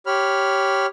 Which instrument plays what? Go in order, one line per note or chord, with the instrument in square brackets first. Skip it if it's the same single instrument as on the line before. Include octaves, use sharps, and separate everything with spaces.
[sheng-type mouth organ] G4 C#5 B5 F6